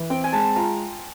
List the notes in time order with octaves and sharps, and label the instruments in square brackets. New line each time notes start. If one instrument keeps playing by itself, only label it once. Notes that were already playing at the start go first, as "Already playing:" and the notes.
Already playing: [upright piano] E3
[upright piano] C4 [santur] G5
[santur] G#5
[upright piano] G#3 [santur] A5
[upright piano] F4 [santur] A#5